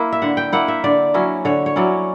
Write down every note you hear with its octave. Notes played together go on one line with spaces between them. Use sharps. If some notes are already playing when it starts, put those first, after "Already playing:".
Already playing: A#3 E4
E5
D3 F#5
G5
A#3 E4 F#5
E5
D3 D5
F#3 C#4 E4
D3 C#5
C#5
F#3 C#4 E4 D5